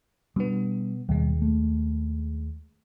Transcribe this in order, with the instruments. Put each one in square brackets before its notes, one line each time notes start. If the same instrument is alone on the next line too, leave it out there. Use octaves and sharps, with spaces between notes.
[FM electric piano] B2 B3 [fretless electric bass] G3 D4
[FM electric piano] D#2 G#3 [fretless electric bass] B2 G3
[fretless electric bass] A3